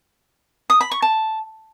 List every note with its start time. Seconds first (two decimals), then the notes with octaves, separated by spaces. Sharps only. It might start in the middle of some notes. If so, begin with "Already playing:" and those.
0.70 D#6
0.81 B5
0.91 C#6
1.02 A5